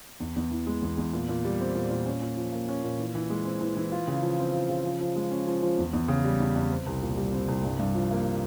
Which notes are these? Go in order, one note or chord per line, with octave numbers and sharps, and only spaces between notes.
E2
E2
E3
G#3
E2
E2
A#2
A#2
G3
C4
A#2
A#2
C#4
A#2
F3
A#3
C#4
A#2
E3
E3
G#3
C4
E3
E3
F4
C#3
F3
C4
F4
C#3
F3
F3
G#3
C#4
F3
F3
E2
E2
C#3
G3
E2
E2
C4
C2
A#2
G3
C4
C2
G2
G2
F3
A#3